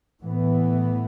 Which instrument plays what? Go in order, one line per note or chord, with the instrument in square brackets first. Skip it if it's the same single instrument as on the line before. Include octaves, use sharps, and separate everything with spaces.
[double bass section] A2 E3 B3